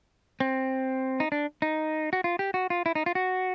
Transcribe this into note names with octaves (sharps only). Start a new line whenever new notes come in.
C4
D#4
D4
D#4
F#4
F4
G4
F#4
F4
E4
D#4
F4
F#4